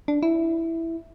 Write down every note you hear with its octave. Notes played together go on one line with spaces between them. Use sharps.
D4
E4